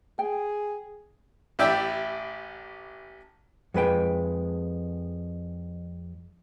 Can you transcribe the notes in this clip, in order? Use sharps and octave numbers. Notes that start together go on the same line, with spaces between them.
G#4 G5
A1 E4 G4 D5 E5 G5
F2 G#3 B4 G5